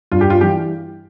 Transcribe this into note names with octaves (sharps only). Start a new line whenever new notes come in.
G2 F4
G4
F4
E3 G3 G4